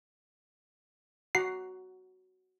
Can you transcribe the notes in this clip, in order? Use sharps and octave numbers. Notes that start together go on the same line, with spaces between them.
F#4 F#5 A#5 C7